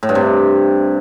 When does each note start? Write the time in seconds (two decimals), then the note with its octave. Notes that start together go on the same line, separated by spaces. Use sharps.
0.03 A2
0.09 G2
0.15 C3